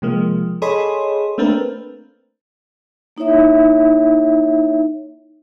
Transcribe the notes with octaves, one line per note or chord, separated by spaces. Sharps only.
C3 F3 G#3 A#3
G#4 A4 C#5 D#5 B5 C6
A3 A#3 C4 D4 A#4 B4
A#3 D#4 E4 C#5 E5